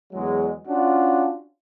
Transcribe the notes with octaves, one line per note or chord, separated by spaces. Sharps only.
E2 F#3 G#3
C#4 D4 F4 F#4